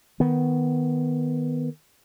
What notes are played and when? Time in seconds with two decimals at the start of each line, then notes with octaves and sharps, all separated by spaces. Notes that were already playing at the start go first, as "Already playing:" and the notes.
0.20 D#3 B3